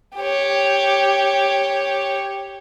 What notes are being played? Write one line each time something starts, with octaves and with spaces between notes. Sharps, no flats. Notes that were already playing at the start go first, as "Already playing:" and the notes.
G4 C#5